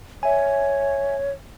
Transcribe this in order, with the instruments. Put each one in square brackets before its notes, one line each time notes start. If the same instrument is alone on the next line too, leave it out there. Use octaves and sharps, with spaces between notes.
[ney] C#5 [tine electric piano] E5 G#5